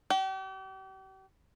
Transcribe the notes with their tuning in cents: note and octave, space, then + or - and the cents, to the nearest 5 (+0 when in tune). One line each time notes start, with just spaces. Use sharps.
G4 -40